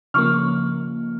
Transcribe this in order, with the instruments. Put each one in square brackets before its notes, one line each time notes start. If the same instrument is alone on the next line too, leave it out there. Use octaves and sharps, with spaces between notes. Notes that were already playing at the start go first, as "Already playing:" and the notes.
[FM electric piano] C#3 F3 A#3 [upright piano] C#6 F6